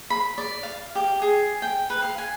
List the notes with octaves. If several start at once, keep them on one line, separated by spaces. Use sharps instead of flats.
B5
D5
F5
G4
G#4
G5
B4
F5
G#5